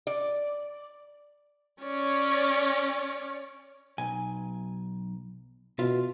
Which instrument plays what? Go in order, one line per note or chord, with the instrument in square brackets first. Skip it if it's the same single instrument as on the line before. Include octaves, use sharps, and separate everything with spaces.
[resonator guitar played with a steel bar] D5
[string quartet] C#4 C#5 D5
[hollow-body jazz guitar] B1 G#5
[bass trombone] B2 [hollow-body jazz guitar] F4 E5